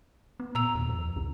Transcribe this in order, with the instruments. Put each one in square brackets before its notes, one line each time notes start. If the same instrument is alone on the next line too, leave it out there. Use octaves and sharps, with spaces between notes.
[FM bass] B3
[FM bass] A#2 [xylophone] A#5 E6 F7
[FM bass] D#2
F2
C#2